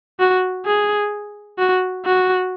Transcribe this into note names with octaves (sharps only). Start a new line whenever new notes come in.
F#4
G#4
F#4
F#4